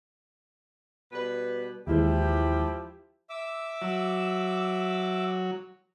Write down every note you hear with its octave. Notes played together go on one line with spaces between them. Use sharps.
B2 G3 B4
D#2 E3 F3 G#3 E4 G4
E5 D6 E6
F#3